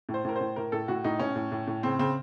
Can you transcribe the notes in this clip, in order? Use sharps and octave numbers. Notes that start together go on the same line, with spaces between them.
A2
C5
A2 A#4
A2 C5
A2 A#4
A2 A4
A2 F#4
A2 D#4
A2 C#4
A2
A2
A2
C#3 C4
C#3 C4